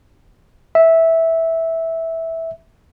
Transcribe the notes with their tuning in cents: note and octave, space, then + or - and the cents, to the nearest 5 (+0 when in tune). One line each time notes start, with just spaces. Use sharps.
E5 -10